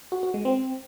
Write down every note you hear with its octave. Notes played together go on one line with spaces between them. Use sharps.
F#4
F#4
G#3
C4